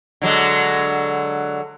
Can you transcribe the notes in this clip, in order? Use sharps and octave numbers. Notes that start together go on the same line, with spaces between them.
D3 F#3 G#3